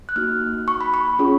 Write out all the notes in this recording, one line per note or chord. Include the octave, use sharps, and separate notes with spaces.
F#6
A#3 D#4 F#4 F6
C#6
B5
C#6
C#4 F4 G#4